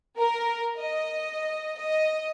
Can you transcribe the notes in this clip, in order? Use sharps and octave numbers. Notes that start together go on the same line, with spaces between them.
A#4
D#5
D#5